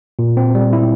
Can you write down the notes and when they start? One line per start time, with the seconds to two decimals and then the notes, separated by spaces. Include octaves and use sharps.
0.19 A#2
0.37 C4
0.55 G3
0.73 E4